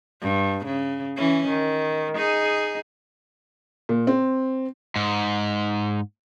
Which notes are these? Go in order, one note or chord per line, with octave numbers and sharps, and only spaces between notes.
G2
C#3
E3 C#4
D#3
D#4 G#4
A#2
C4
G#2